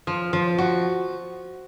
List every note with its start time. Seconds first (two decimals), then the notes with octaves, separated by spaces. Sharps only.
0.07 F3
0.33 F3
0.58 F#4